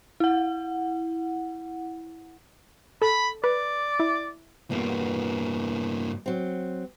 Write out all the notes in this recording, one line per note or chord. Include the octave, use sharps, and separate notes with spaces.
E4 F#5
A4 B5
B4 D5
E4
E2 G2 B2 A#3
F#3 C4